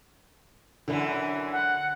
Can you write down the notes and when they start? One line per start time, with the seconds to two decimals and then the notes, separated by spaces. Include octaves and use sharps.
0.88 F#2 D3 E3
1.52 F#5